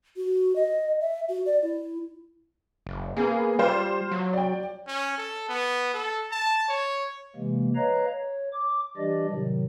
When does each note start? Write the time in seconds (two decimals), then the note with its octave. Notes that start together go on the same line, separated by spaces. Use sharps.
0.16 F#4
0.56 D#5
1.00 E5
1.29 F#4
1.46 D5
1.62 E4
2.87 F#1
3.17 A#3 B3 G#4
3.59 G3 F4 C5
4.11 F#3
4.33 D5 G5
4.87 C#4
5.17 A4
5.49 B3
5.94 A4
6.31 A5
6.68 C#5
7.36 C3 E3 G#3 A#3
7.76 B4 C#5 D#5 F5 A#5
8.12 C#5
8.53 D6
8.97 E3 G3 D4 G4 D5 D#5
9.30 A2 C3 D#3 F#3